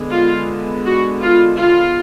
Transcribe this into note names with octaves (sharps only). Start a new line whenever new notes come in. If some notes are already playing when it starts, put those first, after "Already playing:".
Already playing: D3 G#3 B3
F4
F#4
F4
F4